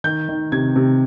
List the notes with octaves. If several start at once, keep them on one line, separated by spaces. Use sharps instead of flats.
D#3 G6
D#3
C3 G#6
C3